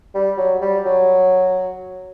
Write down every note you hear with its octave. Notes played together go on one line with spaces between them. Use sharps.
G3
F#3
G3
F#3